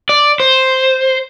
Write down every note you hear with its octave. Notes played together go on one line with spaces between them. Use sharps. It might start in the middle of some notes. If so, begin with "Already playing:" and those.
D5
C5